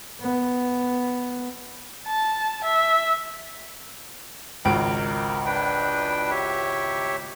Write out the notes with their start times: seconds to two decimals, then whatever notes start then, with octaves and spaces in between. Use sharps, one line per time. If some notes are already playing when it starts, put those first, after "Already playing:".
0.21 B3
2.06 A5
2.64 E5
4.65 G#1 C#2 A#4 D7
5.46 D4 B4 G5
6.31 G4 C#5 E5